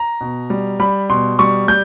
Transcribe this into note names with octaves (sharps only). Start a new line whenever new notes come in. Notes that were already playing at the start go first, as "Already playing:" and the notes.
Already playing: A#5
B2
G3
G3 B5
B2 C6
G3 C#6
G3 G6